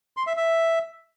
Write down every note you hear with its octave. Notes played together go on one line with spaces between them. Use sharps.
C6
E5
E5